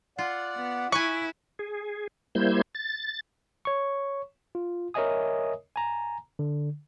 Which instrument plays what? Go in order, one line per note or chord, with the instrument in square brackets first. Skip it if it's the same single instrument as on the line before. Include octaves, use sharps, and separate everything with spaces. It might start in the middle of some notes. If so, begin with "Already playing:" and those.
[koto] F4 [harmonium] D5 F#5
[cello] B3
[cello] E4 [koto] B4 G#5 [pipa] C#6
[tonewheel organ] G#4
G3 A#3 E4 C5 G6 G#6
A6
[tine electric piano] C#5 C#6
F4
A#4 C#5 D#5 E5 G#5 D#6
G#5 A#5
D3